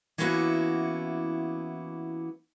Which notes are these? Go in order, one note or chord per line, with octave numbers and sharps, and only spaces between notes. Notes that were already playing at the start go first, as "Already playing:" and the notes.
E3 A#3 B3 C#4 E4 F#4